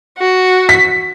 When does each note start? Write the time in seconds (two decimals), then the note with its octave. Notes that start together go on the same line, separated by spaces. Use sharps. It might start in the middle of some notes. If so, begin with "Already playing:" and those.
0.19 F#4
0.69 B6